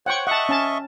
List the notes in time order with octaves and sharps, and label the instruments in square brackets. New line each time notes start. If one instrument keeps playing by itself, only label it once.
[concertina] C5 C#5 [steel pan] F#5 G5 C#6
[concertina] D#5 E5 C#6 [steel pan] F#5 A5
[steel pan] C#4 A5